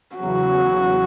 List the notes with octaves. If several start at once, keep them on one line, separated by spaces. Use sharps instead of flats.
E2 C#3 F#3 F#4